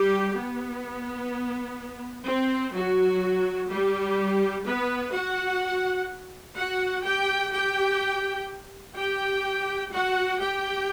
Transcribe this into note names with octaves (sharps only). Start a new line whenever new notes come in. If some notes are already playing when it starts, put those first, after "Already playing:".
Already playing: G3 G4
B3
C4
F#3 F#4
G3 G4
B3 B4
F#4 F#5
F#4 F#5
G4 G5
G4 G5
G4 G5
F#4 F#5
G4 G5